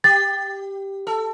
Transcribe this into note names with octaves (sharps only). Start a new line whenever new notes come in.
G4 A6
A4